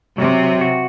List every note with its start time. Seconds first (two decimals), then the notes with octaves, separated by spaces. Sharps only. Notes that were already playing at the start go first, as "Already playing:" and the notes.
0.18 C3 F#3
0.61 F#4